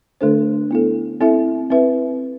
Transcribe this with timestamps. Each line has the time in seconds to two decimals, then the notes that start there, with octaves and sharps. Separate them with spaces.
0.21 D3 A3 D4 A4 C5
0.71 B3 E4 A4
1.21 C4 E4 A4 E5
1.70 C4 E4 B4 E5